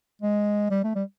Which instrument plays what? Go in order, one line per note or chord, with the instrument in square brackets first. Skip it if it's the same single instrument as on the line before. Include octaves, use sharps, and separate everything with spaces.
[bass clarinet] G#3
G3
A3
G3